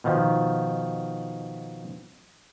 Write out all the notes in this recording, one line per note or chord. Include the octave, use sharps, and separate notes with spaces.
B2 D#3 F3